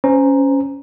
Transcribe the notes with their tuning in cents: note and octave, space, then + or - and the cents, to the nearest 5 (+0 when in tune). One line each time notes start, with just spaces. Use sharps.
C#4 +0 C5 -25 A#5 +0